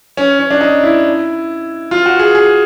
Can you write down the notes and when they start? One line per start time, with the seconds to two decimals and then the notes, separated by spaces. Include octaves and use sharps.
0.17 C#4
0.39 C#4
0.51 D4
0.61 D#4
0.83 E4
1.91 F4
2.06 F#4
2.19 G#4
2.35 G#4